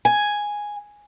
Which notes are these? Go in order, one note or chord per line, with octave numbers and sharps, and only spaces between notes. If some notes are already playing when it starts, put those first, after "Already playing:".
G#5